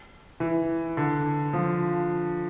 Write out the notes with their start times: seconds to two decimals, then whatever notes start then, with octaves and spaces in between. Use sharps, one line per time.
0.40 E3
0.97 D3
1.53 F3